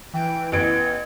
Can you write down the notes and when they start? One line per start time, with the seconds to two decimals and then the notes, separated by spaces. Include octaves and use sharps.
0.13 E3 G5
0.52 A1 B3 G#6 D7